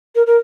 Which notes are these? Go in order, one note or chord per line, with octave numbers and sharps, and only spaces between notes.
A#4
A#4